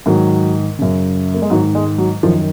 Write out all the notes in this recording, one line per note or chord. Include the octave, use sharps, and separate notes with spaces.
G#2 D#3 F#3
F#2 C#3
A#3
G#3
G#2 D#3 F#3
G#3
F#3
F#2 D#3 F3